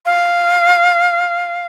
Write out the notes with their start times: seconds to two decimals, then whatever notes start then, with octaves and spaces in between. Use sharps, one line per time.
0.05 F5